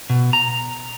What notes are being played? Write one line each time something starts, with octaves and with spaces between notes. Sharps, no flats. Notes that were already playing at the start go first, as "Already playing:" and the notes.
B2
A#5